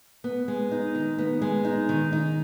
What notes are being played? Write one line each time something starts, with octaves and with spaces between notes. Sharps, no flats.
B3
G#3
D#4
D#3
B3
G#3
D#4
D#3
D#4